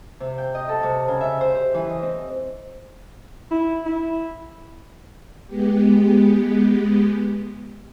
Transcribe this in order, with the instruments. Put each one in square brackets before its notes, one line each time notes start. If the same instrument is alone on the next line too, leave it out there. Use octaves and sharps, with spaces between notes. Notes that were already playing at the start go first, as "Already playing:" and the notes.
[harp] C3
G5
D#5
A4
C3
C#3
E5
C5
G4
E3
D#5
C4
[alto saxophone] E4
E4
[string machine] G#3 B3 G4